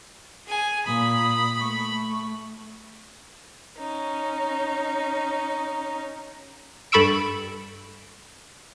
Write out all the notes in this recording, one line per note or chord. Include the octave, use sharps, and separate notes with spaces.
G#4 G#5
A#2 B5 D#6
A3 C#6
C#4 D#4
G2 A4 B5 C#6 E6 D7